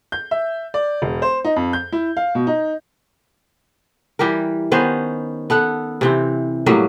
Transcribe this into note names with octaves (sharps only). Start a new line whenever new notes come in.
G6
E5
D5
E1
C5
D#4
F2
G6
E4
F5
B2
D#4
E3 G3 G4 A#4
D#3 B3 C#4 C5
B3 A4 F#5
C3 E3 C4
A2 F#3 G3 A#3